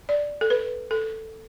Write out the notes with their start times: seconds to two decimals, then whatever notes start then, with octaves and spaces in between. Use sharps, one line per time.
0.09 D5
0.41 A4
0.50 B4
0.91 A4